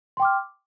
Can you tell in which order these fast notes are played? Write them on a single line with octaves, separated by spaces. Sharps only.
C6 G5 D6 F6